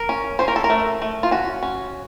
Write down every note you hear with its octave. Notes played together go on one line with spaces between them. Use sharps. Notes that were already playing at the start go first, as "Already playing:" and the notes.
Already playing: A#4
C#4
C#4 C5
A#4
A4
A#4
A3
A3
F4
C#4 F#4
C#4